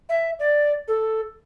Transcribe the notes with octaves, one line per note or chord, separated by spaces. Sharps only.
E5
D5
A4